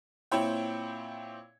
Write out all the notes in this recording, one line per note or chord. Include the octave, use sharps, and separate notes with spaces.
A#2 C4 E4 C#5 G5